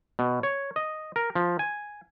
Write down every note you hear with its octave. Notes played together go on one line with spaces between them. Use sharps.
B2
C#5
D#5
A#4
F3
G#5